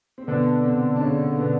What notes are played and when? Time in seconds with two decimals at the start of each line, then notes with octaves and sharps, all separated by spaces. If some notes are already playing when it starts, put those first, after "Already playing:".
0.18 C4
0.27 B2 D3 B3
0.64 C3 C4
0.96 D4
1.00 C#3 C#4
1.37 B2 B3